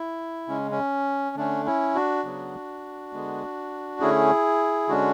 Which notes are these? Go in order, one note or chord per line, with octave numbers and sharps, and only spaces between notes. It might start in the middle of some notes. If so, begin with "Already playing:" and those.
Already playing: E4
C#3 G#3 C#4
C#4
D3 A3 C#4 D4
C#4 E4
D4 F#4
C#3 F#3 B3
D3 G#3 B3
D3 A3 C#4 E4 G#4
D3 G#3 C#4 D4 F#4